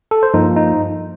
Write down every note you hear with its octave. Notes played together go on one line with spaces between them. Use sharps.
A4
C5
G2 F3 A#3 D#4
D#4